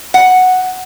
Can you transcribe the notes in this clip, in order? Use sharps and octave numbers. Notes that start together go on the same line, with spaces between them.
F#5